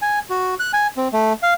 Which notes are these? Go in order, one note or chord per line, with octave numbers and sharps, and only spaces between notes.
G#5
F#4
F#6
G#5
C4
A3
F5